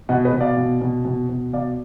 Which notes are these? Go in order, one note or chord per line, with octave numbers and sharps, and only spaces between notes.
B2 D#5 F#5
B4 D#5
B2
D5 F5
B2
B2
B2
B2
B2 D5 F5